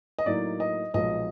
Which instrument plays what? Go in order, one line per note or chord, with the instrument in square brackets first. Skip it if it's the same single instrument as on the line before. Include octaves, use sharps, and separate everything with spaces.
[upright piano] D#5
A2 F#3 A#3 D#4 D5
D#5
B1 A#2 F3 G#3 B3 D#5